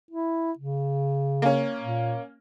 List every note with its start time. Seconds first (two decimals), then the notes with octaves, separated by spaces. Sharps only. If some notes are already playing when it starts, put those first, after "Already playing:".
0.11 E4
0.58 C#3
1.42 A#3 C#4
1.80 A#2